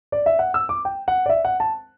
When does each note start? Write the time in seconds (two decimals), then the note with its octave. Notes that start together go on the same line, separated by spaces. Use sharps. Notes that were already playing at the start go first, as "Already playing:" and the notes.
0.12 D5
0.26 E5
0.39 F#5
0.54 E6
0.69 D6
0.85 G5
1.08 F#5
1.26 D5
1.29 E5
1.45 F#5
1.60 A5